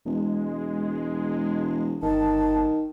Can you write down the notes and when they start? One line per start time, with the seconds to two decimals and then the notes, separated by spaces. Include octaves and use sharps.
0.06 E1 G#3
2.02 G1 D#3 A5